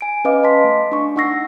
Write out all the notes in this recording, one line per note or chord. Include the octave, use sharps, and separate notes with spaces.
G#5 D7
C#4 B4 D#5 F5 D6
D#5 A5 C6 B6
A3
D4 C#6
D#4 F#5 C#6 E6 A#6 C7